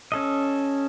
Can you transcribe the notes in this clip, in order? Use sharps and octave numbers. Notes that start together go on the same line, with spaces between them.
C#4 A4 D#5